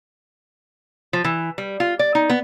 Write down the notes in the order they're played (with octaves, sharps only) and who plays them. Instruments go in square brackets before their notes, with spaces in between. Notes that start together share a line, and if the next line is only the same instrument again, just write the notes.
[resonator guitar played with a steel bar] F3
E3
G3
F4
D5
D#4
B3